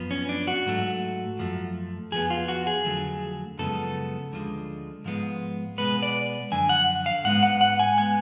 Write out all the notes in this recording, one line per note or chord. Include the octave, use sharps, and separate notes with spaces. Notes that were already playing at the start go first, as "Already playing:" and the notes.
Already playing: F#2 F3 B3
C#4
D4
F#4
G#2 F#3 A3
F#2 F3 A3
F2 F3 B3 G#4
F4
F#4
G#4
F2 D3 F#3 A3
F#2 C#3 F3 G#3 B3 A4
D2 D3 F3 G#3
G#2 F3 G#3 B3
B2 G#3 B3 B4
D5
F#2 D3 F3 G#5
F#5
F5
G#2 G#3 B3 F#5
F#5
F#5
G#5
G#3 B3 G#5